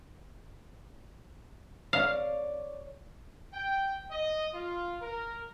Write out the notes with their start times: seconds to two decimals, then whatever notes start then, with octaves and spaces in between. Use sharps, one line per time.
1.93 C#5 D5 F5
3.54 G5
4.10 D#5
4.54 F4
5.01 A#4